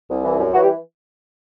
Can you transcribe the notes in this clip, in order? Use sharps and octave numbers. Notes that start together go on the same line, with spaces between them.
C2
E3
F#2
E3 F#3 F#4
G3 G4